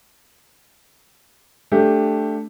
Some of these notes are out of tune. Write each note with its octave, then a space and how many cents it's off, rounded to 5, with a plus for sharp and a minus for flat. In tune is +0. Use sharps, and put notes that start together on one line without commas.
A3 +0 D4 +0 G4 +10